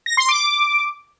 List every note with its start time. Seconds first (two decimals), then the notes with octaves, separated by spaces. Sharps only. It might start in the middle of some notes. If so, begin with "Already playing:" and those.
0.06 A#6
0.17 C6
0.28 D6